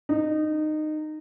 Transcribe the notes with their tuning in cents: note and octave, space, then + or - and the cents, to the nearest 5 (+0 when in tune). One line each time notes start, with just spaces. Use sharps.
D#4 -20